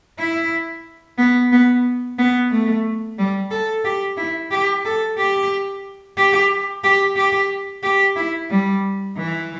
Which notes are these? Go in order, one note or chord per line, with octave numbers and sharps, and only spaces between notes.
E4
B3
B3
B3
A3
G3
A4
G4
E4
G4
A4
G4
G4
G4
G4
G4
E4
G3
E3